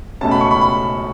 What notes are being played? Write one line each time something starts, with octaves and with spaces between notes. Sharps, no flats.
C#2 B2 A3 C#4 A5
B5
C#6
B5
B5